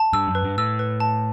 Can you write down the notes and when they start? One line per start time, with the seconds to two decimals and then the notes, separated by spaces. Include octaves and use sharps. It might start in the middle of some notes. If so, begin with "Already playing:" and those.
Already playing: A5
0.13 G2 E6
0.28 F#2
0.35 B4
0.43 G2
0.58 A2 E6
0.79 B4
1.00 A5